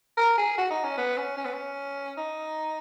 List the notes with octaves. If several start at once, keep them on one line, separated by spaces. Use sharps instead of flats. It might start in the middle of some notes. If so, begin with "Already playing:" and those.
A#4
G#4
F#4
D#4
C#4
B3
C#4
C#4
B3
C#4
D#4